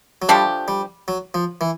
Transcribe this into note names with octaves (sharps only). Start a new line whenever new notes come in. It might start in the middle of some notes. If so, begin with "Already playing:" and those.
F#3
F3 G3 A3 D4 G4
G3
F#3
F3
E3